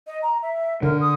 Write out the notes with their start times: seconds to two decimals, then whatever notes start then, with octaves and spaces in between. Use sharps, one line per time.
0.07 D#5
0.22 A#5
0.42 E5
0.83 D3 A#4
1.01 D#6